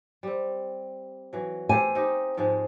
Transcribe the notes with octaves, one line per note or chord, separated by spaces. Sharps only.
G3 C4
E3 F#3
G4 A4 C5 G#5
C4 D#4 G4
G#2 F3 G#3